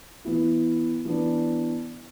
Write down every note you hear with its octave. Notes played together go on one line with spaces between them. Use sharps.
E3 B3 E4
E3 B3 D4